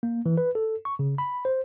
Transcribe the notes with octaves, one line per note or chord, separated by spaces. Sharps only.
A#3
E3
B4
A4
C#6
C#3
B5
C5